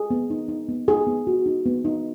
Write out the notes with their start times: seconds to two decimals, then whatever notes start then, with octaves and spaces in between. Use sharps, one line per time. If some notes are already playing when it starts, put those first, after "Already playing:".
Already playing: G#4
0.10 B3
0.30 D#4
0.48 D#4
0.69 B3
0.88 D#4 G#4
1.07 B3
1.27 F#4
1.46 D#4
1.66 B3
1.85 D#4